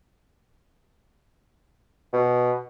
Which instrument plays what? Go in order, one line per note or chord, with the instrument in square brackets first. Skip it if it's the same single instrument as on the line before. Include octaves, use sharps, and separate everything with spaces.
[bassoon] B2